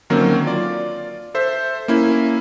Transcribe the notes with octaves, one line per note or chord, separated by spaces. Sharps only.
D3 D#3 F#3 A#3 C4 C#4
F4 D5
A4 C5 E5
A#3 C#4 E4